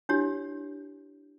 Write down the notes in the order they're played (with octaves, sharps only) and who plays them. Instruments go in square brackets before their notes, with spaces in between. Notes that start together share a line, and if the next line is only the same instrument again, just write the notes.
[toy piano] D4 E4 G4 C#5